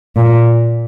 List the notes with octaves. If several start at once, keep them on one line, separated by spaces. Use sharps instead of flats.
A#2